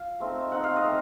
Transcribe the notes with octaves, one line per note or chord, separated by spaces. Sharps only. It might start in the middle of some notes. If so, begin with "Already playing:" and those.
Already playing: F4 F5
A3 C4 D#4
A3 C4 D#4 F#5
F5
D#5
A3 C4 D#4